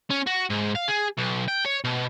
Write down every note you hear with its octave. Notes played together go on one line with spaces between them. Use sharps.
C#4
F#4
G#2
F5
G#4
B1
G5
C#5
B2